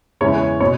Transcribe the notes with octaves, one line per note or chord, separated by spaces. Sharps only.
E2 C#3 E3 G#3 C#4 C#5
B2 C#5